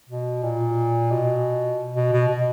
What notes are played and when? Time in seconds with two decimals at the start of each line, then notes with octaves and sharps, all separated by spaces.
0.09 B2
0.43 A#2
1.11 B2
1.95 B2
2.13 B2
2.28 B2